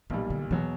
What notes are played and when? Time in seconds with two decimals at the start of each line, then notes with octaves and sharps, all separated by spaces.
0.10 B1 A#2 E3 G3
0.30 D3
0.51 E2 B2 E3 F#3